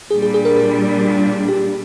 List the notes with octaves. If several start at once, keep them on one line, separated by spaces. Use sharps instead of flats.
A#2 G3 D4 G#4
G#4
G#4
A#4
G#4
G4